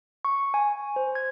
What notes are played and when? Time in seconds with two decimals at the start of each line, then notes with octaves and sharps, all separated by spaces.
0.25 C#6
0.54 G#5
0.96 C5
1.15 G#6